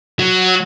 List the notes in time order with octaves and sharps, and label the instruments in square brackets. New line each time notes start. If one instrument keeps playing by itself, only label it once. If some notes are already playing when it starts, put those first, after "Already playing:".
[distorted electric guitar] F#3